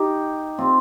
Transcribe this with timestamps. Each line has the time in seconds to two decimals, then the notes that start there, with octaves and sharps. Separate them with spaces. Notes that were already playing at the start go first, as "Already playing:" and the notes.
Already playing: D#4 G4
0.58 C4 F4